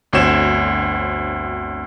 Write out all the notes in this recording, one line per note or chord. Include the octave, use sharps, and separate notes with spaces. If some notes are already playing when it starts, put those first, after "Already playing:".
G1 D2 C4 F#4 C#5 E7